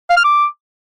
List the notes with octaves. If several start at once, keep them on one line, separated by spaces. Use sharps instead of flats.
F5
F6
D6